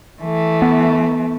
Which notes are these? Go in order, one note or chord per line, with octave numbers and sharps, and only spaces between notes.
E3 A3
B3